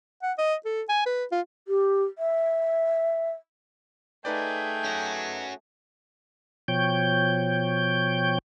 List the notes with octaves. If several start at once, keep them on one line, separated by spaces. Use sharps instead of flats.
F#5
D#5
A4
G#5
B4
F4
G4
E5
A3 D#4 G#4 B4 D5 G5
C#4 F#4
B2 F3 C#5 G5 G6